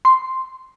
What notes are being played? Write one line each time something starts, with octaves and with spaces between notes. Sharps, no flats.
C6